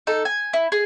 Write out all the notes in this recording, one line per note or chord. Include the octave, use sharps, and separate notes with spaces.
D#4 A4
G#5
E4
G#4